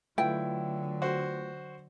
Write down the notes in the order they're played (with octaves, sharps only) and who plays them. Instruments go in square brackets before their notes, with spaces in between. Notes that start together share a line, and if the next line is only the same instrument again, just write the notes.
[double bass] D3 F#3 [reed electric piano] A3 F4 B4 [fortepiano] E4 [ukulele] G5
[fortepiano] F#4 C5